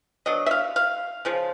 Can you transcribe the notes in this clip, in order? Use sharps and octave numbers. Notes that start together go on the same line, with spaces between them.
F#3 B3 D4 D#5
E5
F5
F5
C#3 F3 G#3